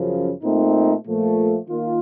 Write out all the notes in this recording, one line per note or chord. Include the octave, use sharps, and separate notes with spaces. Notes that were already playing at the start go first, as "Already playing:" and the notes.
Already playing: F#2 C#3 F3
A#2 A3 C4 D#4
A#2 F3 A3
D#3 A#3 F4